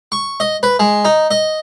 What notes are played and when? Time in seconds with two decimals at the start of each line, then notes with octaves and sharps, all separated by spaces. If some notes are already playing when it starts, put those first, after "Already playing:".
0.12 C#6
0.40 D#5
0.63 B4
0.80 G#3
1.05 D#4
1.31 D#5